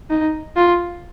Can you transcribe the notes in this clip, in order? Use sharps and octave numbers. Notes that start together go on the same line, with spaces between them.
D#4
F4